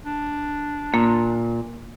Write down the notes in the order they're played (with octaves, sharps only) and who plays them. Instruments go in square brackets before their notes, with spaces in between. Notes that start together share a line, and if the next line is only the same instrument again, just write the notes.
[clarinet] D4
[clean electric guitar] A#2 [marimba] A#3